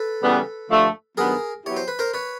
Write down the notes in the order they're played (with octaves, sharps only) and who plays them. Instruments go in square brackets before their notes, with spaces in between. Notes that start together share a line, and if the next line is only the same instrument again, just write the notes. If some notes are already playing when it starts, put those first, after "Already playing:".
Already playing: [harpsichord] A4 B4
[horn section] C#3 E3 G3 B3
G2 D3 F3 A3
[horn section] G2 D#3 F#3 B3 [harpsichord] G#4 A#4
[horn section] F#3 B3 E4 G4 [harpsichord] C#5
[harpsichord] C5
B4
A#4 C5
B4 C#5